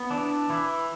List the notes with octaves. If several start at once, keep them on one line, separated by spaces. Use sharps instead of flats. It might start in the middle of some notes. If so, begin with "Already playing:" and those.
Already playing: B3
E3 D4
E3 E4